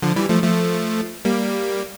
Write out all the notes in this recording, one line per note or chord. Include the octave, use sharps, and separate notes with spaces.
D3 F3
E3 G3
F3 A3
F3 A3
G3 A#3